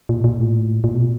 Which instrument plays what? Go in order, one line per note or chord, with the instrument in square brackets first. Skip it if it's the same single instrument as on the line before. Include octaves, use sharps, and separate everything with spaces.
[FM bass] A#2
A#2
A2
A#2
B2